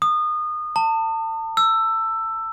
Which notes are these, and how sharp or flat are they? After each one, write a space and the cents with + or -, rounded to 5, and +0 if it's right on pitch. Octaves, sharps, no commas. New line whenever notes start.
D#6 -25
A5 +35
E6 +10